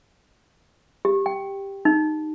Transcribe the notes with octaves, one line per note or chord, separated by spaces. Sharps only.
G4
G5
D#4